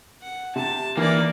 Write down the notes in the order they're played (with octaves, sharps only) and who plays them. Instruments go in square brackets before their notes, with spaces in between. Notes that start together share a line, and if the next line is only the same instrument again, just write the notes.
[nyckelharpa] F#5
[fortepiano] C3 [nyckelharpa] G4 A5
[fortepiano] E3 [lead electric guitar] A#3 [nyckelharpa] D#4 D5